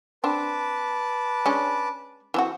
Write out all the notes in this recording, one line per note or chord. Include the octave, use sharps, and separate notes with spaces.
C4 D4 B4 A5 D6
G#3 C#4 D4
E3 C4 F#4